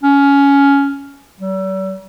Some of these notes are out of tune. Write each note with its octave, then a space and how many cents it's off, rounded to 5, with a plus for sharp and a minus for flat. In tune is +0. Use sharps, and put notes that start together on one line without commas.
C#4 +15
G3 -45